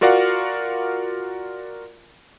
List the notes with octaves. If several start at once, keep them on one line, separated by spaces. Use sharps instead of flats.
F4 F#4 A#4 D5 F5 F#5